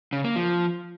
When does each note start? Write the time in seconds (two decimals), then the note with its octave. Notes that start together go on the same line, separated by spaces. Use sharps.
0.13 C#3
0.24 A#3
0.36 F3